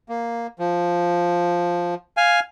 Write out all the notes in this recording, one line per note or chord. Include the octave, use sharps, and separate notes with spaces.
A#3
F3
F5 G#5